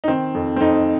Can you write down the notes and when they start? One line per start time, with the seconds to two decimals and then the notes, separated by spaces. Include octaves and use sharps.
0.04 D#4
0.08 D#3 C4
0.35 F2
0.56 C4
0.61 F2 D#4